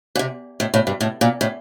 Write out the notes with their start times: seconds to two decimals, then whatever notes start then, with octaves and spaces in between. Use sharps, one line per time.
0.16 A#2
0.19 C3
0.60 A2
0.74 A2
0.87 G2
1.01 A2
1.21 A#2
1.41 A2